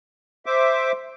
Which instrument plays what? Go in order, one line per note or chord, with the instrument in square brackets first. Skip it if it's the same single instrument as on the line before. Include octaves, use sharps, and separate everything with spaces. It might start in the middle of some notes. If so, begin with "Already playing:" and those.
[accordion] C5 E5 D6